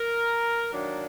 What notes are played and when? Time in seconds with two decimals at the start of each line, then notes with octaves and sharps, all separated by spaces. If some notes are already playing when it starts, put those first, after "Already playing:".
Already playing: A#4
0.72 D#3 F#3 A#3 D4